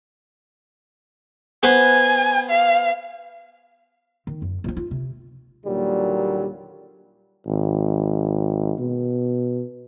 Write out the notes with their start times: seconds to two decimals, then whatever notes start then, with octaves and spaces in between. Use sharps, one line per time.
1.63 B3 B4 C5 G#5
2.50 F5
4.27 D#3
4.42 F#2
4.64 D2 F3
4.77 F4
4.91 C3
5.66 D#2 A#2 D3 F#3 G3
7.47 G#1
8.79 B2